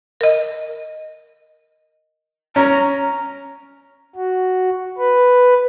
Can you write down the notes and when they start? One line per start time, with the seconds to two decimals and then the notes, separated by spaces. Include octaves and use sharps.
0.21 A#4 D#5
2.56 C#4 A#5
4.16 F#4
4.98 B4